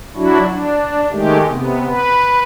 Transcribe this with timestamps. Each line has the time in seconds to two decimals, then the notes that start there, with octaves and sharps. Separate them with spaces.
0.16 F#3 D4 E4 F#4
0.48 D4
1.11 D#3 G#3 A3 G4
1.48 C3 B3
1.87 B4